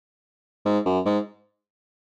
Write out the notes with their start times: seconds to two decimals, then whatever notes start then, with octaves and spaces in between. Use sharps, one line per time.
0.65 G#2
0.85 F#2
1.05 G#2